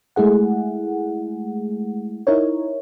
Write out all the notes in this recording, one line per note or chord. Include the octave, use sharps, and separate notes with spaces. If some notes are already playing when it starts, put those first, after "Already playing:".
G#3 A3 E4 G#4 F#5
D#4 E4 A#4 C#5